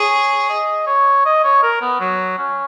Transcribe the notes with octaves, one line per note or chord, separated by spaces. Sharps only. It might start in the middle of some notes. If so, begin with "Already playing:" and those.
Already playing: G#4 C#5
D#5
C#5
D#5
C#5
A#4
B3
F#3
C#4